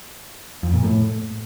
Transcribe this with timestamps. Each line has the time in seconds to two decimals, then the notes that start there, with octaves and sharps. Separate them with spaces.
0.63 F2
0.74 A#2
0.84 A2